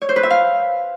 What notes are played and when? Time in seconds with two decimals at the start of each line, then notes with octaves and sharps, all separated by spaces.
0.02 C#5
0.09 C5
0.16 B4
0.23 E5
0.31 F5